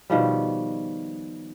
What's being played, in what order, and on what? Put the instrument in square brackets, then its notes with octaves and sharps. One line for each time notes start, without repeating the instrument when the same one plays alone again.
[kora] B2 D#3 F3 G3